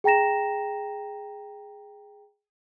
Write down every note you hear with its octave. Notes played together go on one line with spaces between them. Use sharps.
G#4 G5 A#5 A#6 E7